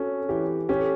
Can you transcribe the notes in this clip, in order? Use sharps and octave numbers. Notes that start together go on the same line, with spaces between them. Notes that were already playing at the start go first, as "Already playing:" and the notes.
Already playing: C#4 F#4 A4
E3 G4
C#4 G4
A4